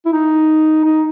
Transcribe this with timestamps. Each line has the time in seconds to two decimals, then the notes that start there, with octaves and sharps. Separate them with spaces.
0.05 E4
0.12 D#4
0.84 D#4